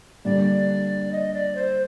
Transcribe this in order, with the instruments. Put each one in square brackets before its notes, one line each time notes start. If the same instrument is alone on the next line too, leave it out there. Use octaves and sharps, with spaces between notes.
[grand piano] G2 D3 G3 A#3 [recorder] D5
[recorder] D#5
D5
C5